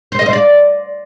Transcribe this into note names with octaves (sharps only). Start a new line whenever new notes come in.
C5
D#5
C5
D5